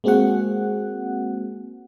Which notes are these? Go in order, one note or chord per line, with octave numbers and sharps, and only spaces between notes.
G#3 A#3 C4 F#4 G#4 F#5